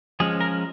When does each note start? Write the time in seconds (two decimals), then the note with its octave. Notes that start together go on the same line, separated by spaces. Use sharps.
0.20 F3 G#3 C#4 G#4
0.41 A#4